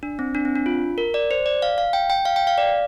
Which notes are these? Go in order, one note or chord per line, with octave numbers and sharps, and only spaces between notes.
D4
C4
D4
C4
D4
F4
A#4
D5
C5
D5
F5
F5
G5
G5
F5
G5
F5
D5